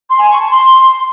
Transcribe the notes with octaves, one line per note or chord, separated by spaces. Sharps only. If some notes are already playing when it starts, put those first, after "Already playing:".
C6
G#5
C#6
A5
C6